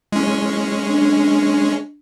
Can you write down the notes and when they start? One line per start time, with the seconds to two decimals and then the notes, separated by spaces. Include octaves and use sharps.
0.12 G#3 C#4 E4
0.86 D4